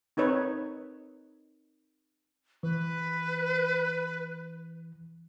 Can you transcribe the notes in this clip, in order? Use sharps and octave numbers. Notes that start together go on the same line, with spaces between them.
C4 D#4 B4 C#5
E3 B4